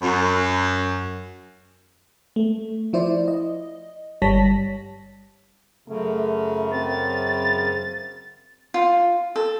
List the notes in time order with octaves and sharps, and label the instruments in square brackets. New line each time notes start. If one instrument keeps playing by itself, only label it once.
[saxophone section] F#2
[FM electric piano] A3
F3 E4 C5 D5
D#5
G1 G3 C#5 A5 A#6 B6
[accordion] F#2 C#3 [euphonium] A3
[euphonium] C4 [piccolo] A6
[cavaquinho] F4
A4